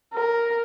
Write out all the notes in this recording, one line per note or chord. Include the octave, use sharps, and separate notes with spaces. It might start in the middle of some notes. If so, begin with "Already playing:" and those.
A#4